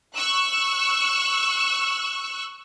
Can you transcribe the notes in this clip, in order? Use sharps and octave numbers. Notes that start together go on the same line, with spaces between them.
C#6 E6 F#6